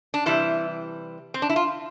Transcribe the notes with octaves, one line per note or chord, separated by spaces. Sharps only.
D4
C3 E3 G3 E4
C4
D4
E4
F4